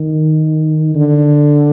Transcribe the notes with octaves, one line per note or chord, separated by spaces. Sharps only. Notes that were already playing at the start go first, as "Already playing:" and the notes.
Already playing: D#3
D3